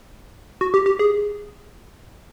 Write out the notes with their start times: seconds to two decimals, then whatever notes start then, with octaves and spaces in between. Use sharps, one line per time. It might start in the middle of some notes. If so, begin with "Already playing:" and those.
0.61 F#4
0.74 G4
0.86 G4
0.99 G#4